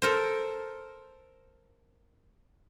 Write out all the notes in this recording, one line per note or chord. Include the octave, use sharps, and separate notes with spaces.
A4 A#4 C5